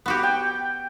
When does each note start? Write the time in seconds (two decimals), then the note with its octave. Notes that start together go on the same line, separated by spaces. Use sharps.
0.06 B3 F#4 G4
0.23 G5